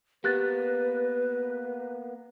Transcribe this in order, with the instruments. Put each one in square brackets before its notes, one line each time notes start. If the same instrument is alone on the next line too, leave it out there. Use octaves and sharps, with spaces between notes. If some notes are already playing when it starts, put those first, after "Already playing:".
[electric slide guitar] A#3 B3 [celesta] G4 F#6 A6 [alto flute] B4